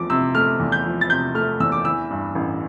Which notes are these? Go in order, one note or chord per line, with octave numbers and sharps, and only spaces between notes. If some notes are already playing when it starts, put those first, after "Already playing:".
Already playing: E2 F3 A3 D6
C3 E6
A3 F6
E2
G6
F3
A6
C3 G6
A3 F6
E2 E6
D6
E3 E6
G2
A1